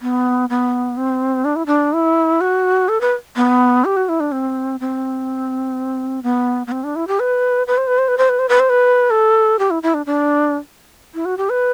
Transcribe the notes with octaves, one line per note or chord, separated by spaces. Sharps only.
B3
B3
C4
D4
E4
D4
E4
F#4
A4
B4
B3
G4
F#4
E4
D4
C4
C4
B3
B3
C4
D4
E4
G4
B4
B4
C5
B4
C5
B4
C5
B4
C5
B4
C5
B4
A4
G4
E4
E4
D4
D4
E4
F#4
G4
B4